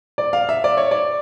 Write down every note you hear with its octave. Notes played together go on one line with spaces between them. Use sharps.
D5
F5
E5
D5
C#5
D5